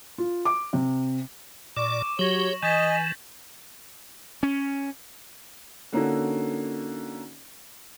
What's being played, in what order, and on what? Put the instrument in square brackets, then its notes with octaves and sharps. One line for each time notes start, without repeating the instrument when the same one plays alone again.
[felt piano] F4
D6
C3
[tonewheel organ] A#2 D5 [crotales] C#6 E7 [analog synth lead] D6
[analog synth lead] F#3 [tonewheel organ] G4 [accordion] C#5 [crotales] A#6 F#7
[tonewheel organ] E3 [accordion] D#5 [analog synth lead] G#5 [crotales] G6 A6 B6
[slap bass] C#4
[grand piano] D3 A#3 C#4 D#4 F#4 A4